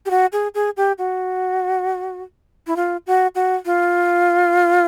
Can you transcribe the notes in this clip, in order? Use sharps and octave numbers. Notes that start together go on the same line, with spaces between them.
G4
F#4
G#4
G#4
G4
F#4
E4
F4
F#4
F#4
F4